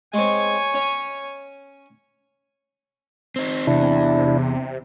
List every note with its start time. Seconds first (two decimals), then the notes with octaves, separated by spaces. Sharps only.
0.14 G#3 C4 C#5 G#5
0.74 C#4
3.36 C4 D#4
3.67 E2 C3 D4 E4